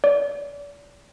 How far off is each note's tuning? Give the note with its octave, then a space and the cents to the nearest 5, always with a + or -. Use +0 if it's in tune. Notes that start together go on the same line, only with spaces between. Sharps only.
D5 -40